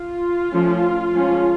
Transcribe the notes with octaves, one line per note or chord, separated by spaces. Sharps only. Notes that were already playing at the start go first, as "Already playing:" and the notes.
Already playing: F4
F3 A3 C#4
F3 G#3 C#4